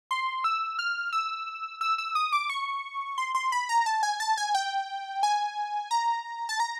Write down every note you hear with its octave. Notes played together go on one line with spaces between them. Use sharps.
C6
E6
F6
E6
E6
E6
D#6
D6
C#6
C6
C6
B5
A#5
A5
G#5
A5
G#5
G5
G#5
A#5
A5
A#5